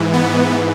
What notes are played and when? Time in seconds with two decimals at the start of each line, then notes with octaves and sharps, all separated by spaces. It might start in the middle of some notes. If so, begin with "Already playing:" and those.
Already playing: G#2 E3
0.13 B3